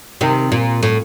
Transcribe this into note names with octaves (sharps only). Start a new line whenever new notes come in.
C3 D#3
A#2
A2